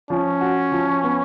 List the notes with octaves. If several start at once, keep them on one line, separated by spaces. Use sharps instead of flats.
F3 C#4
F#4
F3
B3